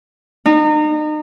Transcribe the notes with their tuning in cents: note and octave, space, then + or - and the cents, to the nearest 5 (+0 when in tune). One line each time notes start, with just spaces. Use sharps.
D#4 -35